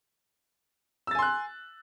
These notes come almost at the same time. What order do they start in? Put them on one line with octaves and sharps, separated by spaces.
E6 A6 G#5 C6 F#6